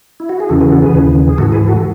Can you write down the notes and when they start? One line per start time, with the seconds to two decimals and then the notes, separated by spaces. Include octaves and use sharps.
0.20 E4
0.29 F#4
0.40 G#4
0.49 E2 C#3 E3 F#4 A4
0.60 G#4 B4
0.72 F#4 A4
0.82 G#4 B4
0.94 D#2 C#3 E3
1.29 G#4
1.38 G#2 F#4 A4
1.43 E3
1.52 G#4 B4
1.67 F#4 A4